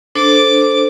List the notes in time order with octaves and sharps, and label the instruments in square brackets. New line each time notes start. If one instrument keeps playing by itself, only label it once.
[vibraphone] D4 A4 C5 [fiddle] D6